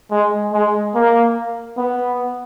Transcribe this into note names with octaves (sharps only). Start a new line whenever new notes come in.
G#3
G#3
A#3
B3